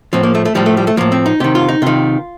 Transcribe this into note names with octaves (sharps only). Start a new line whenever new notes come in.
A2 F3 C4
A#3
A3
A3
A2 F3 G3
A3
G3
A3
A2 F3 A#3
C4
D#4
C3 D#3 G4
F4
D#4
C3 D#3 F4